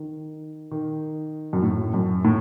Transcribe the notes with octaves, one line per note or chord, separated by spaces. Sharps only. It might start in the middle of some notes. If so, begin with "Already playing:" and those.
Already playing: D#3
D#3
F#2
A2
F#2
A2